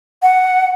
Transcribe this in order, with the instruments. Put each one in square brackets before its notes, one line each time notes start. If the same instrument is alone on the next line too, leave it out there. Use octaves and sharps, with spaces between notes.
[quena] F#5